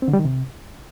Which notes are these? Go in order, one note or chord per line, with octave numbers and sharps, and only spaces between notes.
C4
D3
G3
D#3
C3